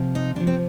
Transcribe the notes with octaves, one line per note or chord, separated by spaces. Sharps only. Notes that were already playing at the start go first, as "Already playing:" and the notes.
Already playing: C3 F3
D#4
C3 F3 D4
C4